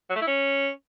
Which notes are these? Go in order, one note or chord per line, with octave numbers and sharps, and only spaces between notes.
F#3
A3
E4
C#4